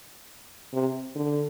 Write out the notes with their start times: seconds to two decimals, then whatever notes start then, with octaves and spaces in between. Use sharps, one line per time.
0.73 C3
1.16 D3